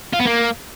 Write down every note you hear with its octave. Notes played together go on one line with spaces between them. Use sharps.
F4
B3
A#3